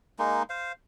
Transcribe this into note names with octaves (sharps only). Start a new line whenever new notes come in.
G#3 A#3 D#4
C5 F5